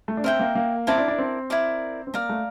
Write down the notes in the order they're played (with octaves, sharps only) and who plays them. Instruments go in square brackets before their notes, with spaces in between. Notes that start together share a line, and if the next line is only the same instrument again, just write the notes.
[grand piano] A3
D4
[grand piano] C4 [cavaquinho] A#4 E5 G5
[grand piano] A#3
A#3
[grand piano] C4 [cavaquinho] E4 A#4 D5 A5
[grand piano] D4
D4
C4
[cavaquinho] E4 A#4 D5
[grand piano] C4
[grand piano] A#3 [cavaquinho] D5 F5 A#5
[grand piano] A3